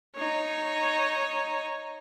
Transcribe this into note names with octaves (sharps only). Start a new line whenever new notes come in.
D#4 C#5